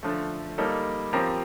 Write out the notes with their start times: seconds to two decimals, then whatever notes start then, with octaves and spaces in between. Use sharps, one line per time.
0.03 D3 F3 A3
0.58 G3 A#3 D#4 A4
1.13 F3 C4 G4 A#4